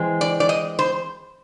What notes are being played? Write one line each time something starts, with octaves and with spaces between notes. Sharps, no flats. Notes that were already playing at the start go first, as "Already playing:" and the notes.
Already playing: E3 G#3 C4
D5
D5
D#5
C5